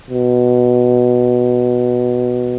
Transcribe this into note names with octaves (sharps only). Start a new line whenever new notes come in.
B2